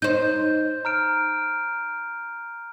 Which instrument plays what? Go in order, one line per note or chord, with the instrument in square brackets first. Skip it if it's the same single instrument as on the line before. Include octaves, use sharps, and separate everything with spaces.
[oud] D#4 C5 [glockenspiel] G6
[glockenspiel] A#5 F6 D7